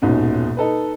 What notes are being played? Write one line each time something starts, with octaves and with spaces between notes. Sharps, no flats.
D#1 G#2 B2 C#4
D#4 A4 B4